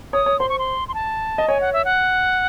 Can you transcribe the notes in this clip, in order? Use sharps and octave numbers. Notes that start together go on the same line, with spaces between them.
C#5 D#6
C#5
C5 C6
C#6
C6
C6
A5
D#5
C#5 G#5
F#5
E5
F#5